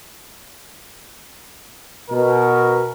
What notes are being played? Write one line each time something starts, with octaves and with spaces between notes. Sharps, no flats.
B2 A#4